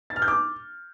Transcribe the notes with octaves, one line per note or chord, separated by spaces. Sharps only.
A6
F6
G6
D6